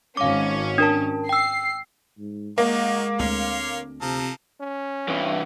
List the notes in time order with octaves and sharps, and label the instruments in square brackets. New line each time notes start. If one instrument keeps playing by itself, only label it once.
[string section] G#1 C#4 [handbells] F5 D6
[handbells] D4 A#4 A5
[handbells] G5 E6 [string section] C7
[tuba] G#2
[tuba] G#3 [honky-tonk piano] A#3 [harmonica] D#4 F#4
[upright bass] D2 C4 [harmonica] C#5 F5 C6
[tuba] C3 [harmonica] F3 A4 A#5
[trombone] C#4
[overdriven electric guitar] G2 E3